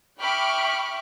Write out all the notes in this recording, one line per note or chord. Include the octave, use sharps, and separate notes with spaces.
E5 G5 B5 C#6 D6 F6